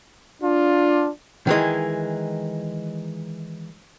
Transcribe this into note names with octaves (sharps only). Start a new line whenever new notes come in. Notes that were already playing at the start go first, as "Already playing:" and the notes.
D4 F4
D#3 E3 G#3